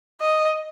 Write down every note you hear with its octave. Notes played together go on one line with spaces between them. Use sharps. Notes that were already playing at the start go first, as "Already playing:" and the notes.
D#5